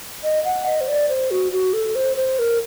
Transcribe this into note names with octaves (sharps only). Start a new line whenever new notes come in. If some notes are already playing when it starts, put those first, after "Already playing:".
D#5
F#5
D#5
C5
D5
C5
F#4
F#4
A4
C5
C5
A#4